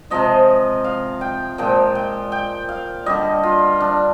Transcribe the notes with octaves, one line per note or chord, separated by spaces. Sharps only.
C3 F3 G#3 D#5
F5
G5
A#2 F3 G#3 G5
G5
G5
F5
D3 G3 D#5
F4
D4